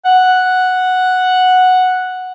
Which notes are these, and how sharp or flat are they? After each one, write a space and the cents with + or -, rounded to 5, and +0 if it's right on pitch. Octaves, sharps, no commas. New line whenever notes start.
F#5 -5